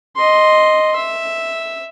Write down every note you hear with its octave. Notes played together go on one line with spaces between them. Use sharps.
D#5 C6
E5